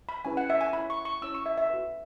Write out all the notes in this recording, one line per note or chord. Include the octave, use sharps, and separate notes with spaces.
B5
C#4 E4 G#4 B4 G#5
F#5
E5
G#5
E4 C#5 B5
C#6
C#6
C#4 E4 C#5 E6
C#6
E5
E5
F#4 B4